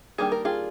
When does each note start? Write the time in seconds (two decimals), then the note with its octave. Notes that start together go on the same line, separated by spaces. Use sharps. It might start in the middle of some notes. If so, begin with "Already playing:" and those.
0.18 D#3 G3 A#3 D4 G#4
0.32 A#4
0.45 F4 G#4